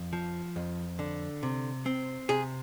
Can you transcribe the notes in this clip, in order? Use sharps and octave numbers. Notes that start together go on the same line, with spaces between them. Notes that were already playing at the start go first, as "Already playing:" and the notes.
Already playing: F2
F3
F2
D3
C3
C4
C3 G#4